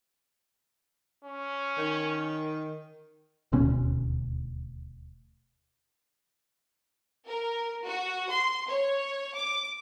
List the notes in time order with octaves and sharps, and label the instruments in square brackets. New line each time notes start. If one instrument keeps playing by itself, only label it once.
[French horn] C#4
[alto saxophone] D#3
[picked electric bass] D#1 D2 B2 C#4
[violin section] A#4
F#4
C6
C#5
D6